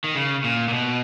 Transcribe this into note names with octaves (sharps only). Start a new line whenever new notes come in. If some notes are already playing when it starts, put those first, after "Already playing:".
D#3
C#3
A#2
A#2
B2